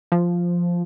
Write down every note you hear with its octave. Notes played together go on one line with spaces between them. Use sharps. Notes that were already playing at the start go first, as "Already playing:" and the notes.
F3